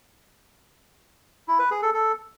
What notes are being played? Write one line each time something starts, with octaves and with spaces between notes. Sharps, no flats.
E4
B4
G#4
A4
A4